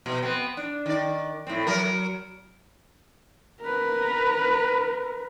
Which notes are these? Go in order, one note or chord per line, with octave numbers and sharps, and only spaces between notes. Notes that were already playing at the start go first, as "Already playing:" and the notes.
B2
B3 C4
D4
D#3 D5
A2 C4
F#3 A#4
A#4 B4